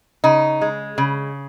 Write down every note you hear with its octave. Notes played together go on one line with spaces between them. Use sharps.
C#3 D#4
G#3
C#3